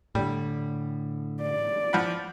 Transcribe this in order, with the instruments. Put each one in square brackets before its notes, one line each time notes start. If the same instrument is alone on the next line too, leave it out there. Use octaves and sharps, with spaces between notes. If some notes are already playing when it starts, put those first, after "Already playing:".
[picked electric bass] A2 D3 [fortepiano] G3
[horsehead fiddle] D5
[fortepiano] F3 F#5 B5